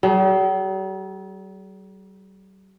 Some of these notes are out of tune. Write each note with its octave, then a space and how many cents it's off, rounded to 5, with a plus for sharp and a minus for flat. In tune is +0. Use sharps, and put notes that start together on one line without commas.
G3 -45 G#4 +25